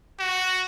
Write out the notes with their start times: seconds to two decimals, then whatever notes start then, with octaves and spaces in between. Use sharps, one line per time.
0.19 F#4